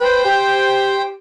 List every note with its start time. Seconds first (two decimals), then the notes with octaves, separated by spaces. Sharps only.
0.01 B4 C5 G5
0.25 G4